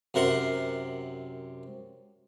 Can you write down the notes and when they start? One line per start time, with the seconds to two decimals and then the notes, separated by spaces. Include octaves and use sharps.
0.14 F#2 C3 A#4 F#5 C6